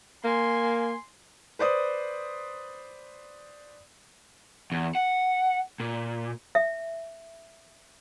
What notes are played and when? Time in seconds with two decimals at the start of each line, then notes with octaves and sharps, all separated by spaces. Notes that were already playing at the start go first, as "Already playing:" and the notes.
0.24 A#3 G#5 C6
1.59 B4 C5 D5 D#6
4.72 E2
4.95 F#5
5.80 A#2
6.55 E5